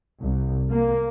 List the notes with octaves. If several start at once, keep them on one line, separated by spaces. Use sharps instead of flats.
C2
A#3